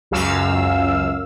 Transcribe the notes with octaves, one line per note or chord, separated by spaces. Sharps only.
C#2 F#2 F5 E6